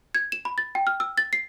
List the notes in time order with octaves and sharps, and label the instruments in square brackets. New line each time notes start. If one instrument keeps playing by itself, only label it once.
[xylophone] G#6
E7
B5
A6
G5
F6
E6
A6
C7